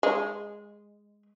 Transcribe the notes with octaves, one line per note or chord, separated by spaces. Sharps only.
G#3